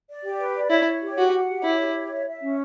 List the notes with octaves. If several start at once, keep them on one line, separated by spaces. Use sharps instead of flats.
D5
G4
B4
D5
E4 C#5
C#5
G4
F#4 F#5
F#5
G4
E4 C#5
G4
C#5
E5
E5
C#4